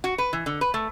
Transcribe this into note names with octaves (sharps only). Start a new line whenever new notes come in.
F#4
B4
E3
D3
B4
A3